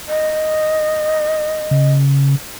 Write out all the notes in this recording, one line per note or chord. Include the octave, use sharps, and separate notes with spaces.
D#5
C#3